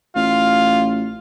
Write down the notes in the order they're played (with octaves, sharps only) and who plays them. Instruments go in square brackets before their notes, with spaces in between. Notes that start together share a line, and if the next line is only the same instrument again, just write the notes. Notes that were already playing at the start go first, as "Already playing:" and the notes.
[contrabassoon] A1 [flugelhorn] F4 [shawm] F5